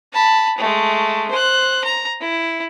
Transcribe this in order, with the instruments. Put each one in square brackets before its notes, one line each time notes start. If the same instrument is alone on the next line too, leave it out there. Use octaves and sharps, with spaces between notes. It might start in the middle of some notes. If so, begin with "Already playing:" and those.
[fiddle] A5 B5
G#3 A3
C5 F#6
A#5
E4